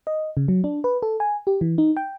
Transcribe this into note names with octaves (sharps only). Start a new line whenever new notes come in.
D#5
C#3
F#3
D4
B4
A4
G#5
G4
E3
D#4
G5